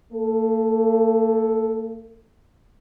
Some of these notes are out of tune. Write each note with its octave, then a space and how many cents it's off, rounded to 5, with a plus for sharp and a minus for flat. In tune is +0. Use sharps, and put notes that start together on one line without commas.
A#3 -45 A4 +0